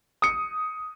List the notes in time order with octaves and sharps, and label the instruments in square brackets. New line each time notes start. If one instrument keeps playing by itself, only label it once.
[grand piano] D#6 C#7